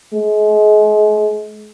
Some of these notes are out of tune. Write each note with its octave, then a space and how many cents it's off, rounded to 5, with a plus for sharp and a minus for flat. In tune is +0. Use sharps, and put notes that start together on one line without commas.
G#3 +35